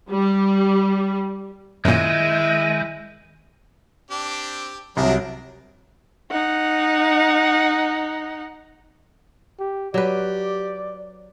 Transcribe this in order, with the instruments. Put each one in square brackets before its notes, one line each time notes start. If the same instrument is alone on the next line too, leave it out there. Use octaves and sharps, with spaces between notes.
[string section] G3
[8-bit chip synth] F#2 A#2 [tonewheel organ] D#3 [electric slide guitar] G#3 [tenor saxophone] E4
[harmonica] C4 D4 G4
[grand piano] C2 [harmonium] C3 F#3 [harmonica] D4 G#4 A#4
[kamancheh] D#4 F#5
[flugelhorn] G4
[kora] F#3 B4 [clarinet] G4 [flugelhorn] D5